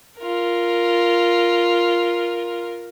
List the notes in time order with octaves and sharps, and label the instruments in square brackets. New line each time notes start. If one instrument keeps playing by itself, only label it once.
[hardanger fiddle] F4 A#4